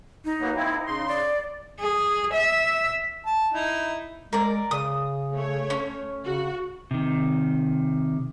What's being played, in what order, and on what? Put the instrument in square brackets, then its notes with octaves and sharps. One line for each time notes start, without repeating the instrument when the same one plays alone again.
[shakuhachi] D#4
[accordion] F#3 A#3 B3
A#3 C4 E4
C#3 C6
[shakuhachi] D5
[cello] G#4
E5
[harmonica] A5
D#4 E4
[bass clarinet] G#3 [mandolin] A#4 D5
[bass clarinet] C#3 [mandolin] D#6
[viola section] A3 C#5
[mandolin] C#4
[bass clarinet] C#3 [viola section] F#4
[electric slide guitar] C3 D#3